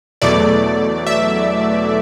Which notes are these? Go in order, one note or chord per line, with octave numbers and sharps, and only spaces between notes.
E2 B2 F#3 A3 D5
E5